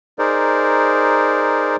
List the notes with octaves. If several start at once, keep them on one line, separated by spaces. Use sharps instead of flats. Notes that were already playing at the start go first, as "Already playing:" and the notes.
D#4 G#4 A#4 C5 D5